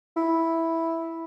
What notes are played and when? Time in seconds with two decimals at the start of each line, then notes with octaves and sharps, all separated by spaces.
0.17 E4